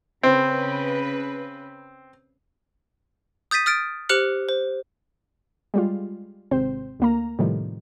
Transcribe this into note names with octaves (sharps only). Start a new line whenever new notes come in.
C#3 C4 B4
D#6 G6 A6 B6 D#7
D#6 F6 A6 D7
G4 C5 F6 F#6 C#7 F#7
C5
G3 G#3 F4
G#1 C3 C4 C5
D2 A#3 A#5
A2 C3 D#3 F3 G3